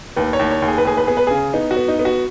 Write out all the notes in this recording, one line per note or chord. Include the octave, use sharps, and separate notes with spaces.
D#2 B4
C#5
D#2
C#5
D#2
G#4
B4
D#2 G#4
B4
B3 G#4
B4
C#3 G#4
B3 D#4
F#4
B3
D#4
B3
F#4